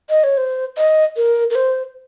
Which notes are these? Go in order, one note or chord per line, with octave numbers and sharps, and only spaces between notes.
D#5
C#5
C5
D#5
A#4
A#4
C5